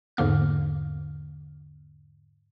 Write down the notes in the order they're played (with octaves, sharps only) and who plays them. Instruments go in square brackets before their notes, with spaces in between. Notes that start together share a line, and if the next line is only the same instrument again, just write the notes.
[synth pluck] E2 G#2 D3 A#3 F6